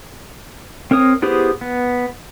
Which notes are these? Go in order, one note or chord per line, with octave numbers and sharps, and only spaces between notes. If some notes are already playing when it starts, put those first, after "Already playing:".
C4 A#4 C#5 D#6
B3 E4 G4 G#4 C5
B3